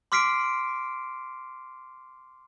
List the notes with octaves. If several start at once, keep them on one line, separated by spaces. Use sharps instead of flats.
C6 D6 F6 B6 C7 D7